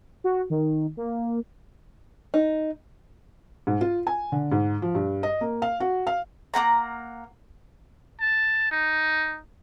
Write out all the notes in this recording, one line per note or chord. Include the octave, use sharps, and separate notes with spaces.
F#4
D#3
A#3
D#4
G#2
F4
G#5
D3
G#2
F3
G2
D#5
A#3
F5
F#4
F5
A#3 C4 F#5 A#5
A5
D#4